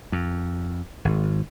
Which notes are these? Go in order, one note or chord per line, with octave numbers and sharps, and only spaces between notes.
F2
G#1